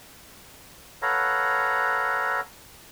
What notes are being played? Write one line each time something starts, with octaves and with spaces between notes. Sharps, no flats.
A4 B4 C#5 F5 F#5 A#5